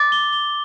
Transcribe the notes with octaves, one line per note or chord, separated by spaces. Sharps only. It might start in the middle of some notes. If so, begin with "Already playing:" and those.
Already playing: D6 A6
G7
G7